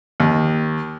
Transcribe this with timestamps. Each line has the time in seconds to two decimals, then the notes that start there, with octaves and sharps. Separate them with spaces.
0.20 D#2